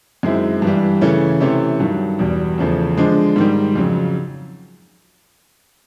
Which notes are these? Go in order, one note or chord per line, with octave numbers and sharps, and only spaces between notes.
F#2 D#3 G#3 C4 E4
G2 E3 G3
C#3 E3 A3 C#4
C3 E3 A3 C#4
G2 D#3 F#3
E2 B2 G3
E2 C#3 F3 A3
D3 F3 G#3
G#2 D#3 G3
F2 C#3 F#3